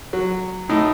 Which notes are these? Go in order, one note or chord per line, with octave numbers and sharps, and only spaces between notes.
F#3
A2 D#4